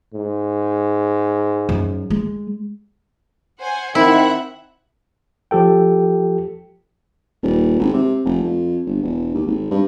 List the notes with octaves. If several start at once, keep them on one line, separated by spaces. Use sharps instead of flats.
G#2
F#2
G#3
C5 F#5 G#5
D#3 C4 E4 E5 F#5 F#6
F3 G4 A4 G5
D#1
G#1
C3
F1
F2
G1
E1
D#2
G#1
G2